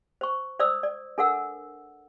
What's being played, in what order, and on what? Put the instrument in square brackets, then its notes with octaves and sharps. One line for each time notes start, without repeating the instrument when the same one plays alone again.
[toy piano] C5 C#6
C5 D5 D#6 E6
D5
D4 A4 A#4 F#5 E6